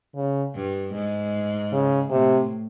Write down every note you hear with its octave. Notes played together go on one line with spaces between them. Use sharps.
C#3
G2
G#2
C#3
A2 C3